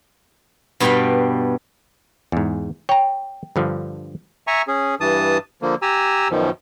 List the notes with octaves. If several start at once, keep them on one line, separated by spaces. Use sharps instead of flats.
G2 B2 G3 F5 G5 B5
E2 G#2
C#5 G5 A#5
G2 D3 F3
E5 G#5 A#5 C#6
C#4 G#4
G2 E3 A5 D#6
D3 F3 A#3
G4 G#5 A#5 E6
F#2 B2 D#3 F3